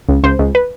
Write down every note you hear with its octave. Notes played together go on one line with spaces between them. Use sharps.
C#2
C#2 C5
C#2
B4